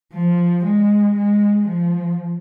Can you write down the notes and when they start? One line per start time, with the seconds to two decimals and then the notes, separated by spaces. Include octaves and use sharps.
0.13 F3
0.66 G#3
1.17 G#3
1.68 F3